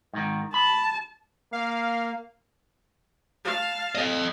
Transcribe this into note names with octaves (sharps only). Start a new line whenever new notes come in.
G#2 D#3
A5 B5
A#3 F5
F5 A5
A4 D#5